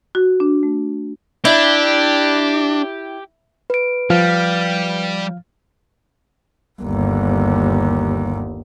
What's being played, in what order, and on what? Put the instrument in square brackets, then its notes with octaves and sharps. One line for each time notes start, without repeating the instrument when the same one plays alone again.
[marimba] F#4
D4
A3
[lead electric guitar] D4 [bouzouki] E4 [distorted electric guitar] G4
[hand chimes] B4 D7
[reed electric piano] F3 F5 F6 [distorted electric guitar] G3
[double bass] G1 D#2